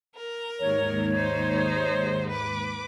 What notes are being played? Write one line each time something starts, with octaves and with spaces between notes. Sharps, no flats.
A#4
D#2 G#2 C#5
D#4 C5
B4 D6